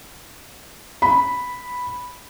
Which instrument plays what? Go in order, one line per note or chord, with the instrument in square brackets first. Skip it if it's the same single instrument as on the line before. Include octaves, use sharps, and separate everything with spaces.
[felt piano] B5